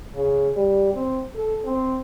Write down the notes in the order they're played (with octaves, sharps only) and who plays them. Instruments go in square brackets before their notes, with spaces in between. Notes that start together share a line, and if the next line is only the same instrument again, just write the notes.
[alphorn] C#3
G3
C4
A4
C4